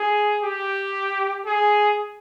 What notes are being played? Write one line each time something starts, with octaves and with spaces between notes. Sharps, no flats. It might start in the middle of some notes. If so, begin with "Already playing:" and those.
Already playing: G#4
G4
G#4